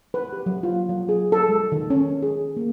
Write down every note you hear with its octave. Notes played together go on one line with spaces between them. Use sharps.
B4
G4
F#3
F4
F#3
G#4
A4
G#3
D#3
C#4
G#4
A#3